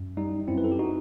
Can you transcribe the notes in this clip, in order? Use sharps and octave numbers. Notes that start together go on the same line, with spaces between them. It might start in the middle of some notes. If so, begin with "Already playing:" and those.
Already playing: F#2
G3 D#4
F#2 C4 E4
B4
A4
G4
D#4 F#4